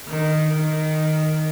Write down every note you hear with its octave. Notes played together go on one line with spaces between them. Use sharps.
D#3
D#3